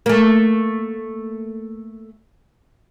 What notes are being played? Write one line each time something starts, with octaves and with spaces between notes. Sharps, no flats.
A3 A#3